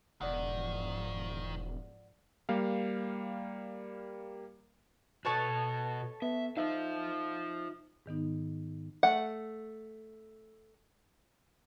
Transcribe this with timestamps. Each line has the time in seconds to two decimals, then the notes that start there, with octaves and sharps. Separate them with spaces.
0.21 E1 G#2 D#3 F3 D5 F#5
2.49 G3 A#3 F5
5.25 B2 F#4 A4 C#5 A5
6.22 B3 E5
6.57 D#4 F4 C5 E5 F5
8.06 G#2 D#3 B3 D#4
9.03 A3 F#5